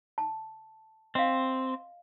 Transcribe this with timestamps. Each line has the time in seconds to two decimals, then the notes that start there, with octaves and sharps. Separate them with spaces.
0.18 A5
1.15 C4 D#5 F5